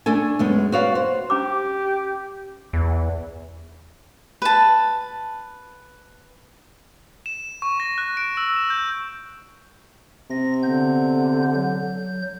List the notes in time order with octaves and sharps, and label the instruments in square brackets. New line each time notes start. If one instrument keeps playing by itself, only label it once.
[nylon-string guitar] A3 D4 A4 G#5
F#2 G#3 B3
F#4 B4 C#5 D5 F5
C5
[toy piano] C#4 B5 D6 [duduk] G4
[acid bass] E2
[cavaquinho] B4 A5
[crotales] E7
C#6
A#6
F#6
D7
E6
E7
G6
[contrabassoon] C3 [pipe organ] A#6
[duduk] D3 [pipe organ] B3 G6
[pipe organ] F#3 G6